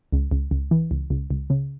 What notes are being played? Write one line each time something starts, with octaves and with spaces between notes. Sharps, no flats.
C#2
C#2
C#2
E3
C#2
C#2
C#2
C#3